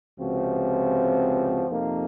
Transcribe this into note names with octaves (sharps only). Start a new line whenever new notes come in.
C#2 C3 F3 C4 F#4
F2 C3 F3 A#3 D#4